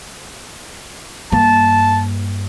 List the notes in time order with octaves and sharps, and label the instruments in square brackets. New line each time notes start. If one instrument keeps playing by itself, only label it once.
[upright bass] G2 A#3 [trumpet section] A5